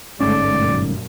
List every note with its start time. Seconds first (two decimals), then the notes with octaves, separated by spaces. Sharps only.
0.20 G1 G#2 G#3 A3 C#4 D5
0.54 F#2 A#2